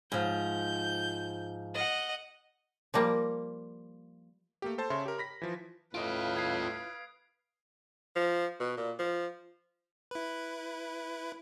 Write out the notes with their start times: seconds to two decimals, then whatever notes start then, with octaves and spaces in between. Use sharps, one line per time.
0.12 G#2 F3 G6
1.74 D#5 F#5
2.94 F3 G3 A#3
4.62 A3 A#3 G4
4.78 A4 C5 A5
4.90 C#3 C#5 E5 A5 C6
5.06 G4 A#4
5.18 B5 A#6 B6
5.42 E3 F3
5.95 A2 F4 B4 D#5 F5 D7
6.35 D#6 G#6 C7
8.16 F3
8.60 B2
8.77 A#2
8.99 F3
10.11 E4 B4